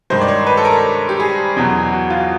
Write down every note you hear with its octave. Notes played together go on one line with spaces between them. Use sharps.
G2 D#3 G#3 C5
D5
C#5
B4
A4
A#4
G4
G#4
E2 B2 F#3
F#4
F4